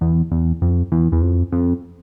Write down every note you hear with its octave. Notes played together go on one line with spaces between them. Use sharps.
E2
E2
F2
E2
E2
F2
F2